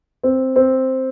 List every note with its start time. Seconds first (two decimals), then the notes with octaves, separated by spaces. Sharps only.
0.24 C4
0.56 C4